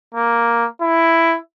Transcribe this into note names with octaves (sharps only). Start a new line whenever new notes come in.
A#3
E4